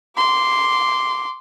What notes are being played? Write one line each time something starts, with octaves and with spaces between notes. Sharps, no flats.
C6 D6